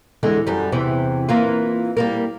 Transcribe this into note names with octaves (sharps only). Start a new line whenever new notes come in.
E2 D3 G#3
F#2 G3
E2 C3 E3
E3 A#3 F4
G3 A#3 A#4